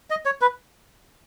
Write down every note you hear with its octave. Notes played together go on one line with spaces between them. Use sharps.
D#5
C#5
B4